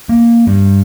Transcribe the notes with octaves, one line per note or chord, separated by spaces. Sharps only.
A#3
G2